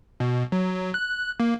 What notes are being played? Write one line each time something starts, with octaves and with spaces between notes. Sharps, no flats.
B2
F#3
F#6
A#3